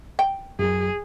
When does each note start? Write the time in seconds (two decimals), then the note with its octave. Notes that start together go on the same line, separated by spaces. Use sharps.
0.19 G5
0.59 F#2 F#3 G#4